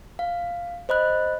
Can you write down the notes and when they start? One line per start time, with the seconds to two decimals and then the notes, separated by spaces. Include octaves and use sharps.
0.19 F5
0.89 C5 D#5 B5 F#6